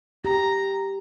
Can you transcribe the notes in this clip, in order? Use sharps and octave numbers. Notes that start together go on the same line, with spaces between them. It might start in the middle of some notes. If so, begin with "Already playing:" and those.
G4 A#5